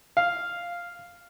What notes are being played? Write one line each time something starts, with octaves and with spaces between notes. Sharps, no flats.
F5